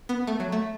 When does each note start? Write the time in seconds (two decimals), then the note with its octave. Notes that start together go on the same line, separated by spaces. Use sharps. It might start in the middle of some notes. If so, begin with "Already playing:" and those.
0.09 B3
0.27 A3
0.40 F#3
0.52 A3